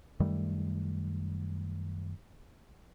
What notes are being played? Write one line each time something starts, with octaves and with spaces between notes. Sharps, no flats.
F#2 D#3 G3 A3